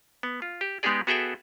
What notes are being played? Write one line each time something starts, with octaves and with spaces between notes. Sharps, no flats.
B3
F4
G4
G#3 B3 D#4 G4 G#4 D5
B3 F#4 G#4 A4 E5 G5